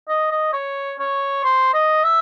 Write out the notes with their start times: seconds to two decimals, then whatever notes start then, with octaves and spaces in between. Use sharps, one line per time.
0.09 D#5
0.31 D#5
0.53 C#5
0.99 C#5
1.44 C5
1.74 D#5
2.04 E5